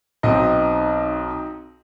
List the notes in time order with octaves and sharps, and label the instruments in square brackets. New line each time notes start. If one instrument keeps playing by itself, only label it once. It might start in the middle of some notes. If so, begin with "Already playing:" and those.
[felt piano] B1 [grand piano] C4 D#4 D#5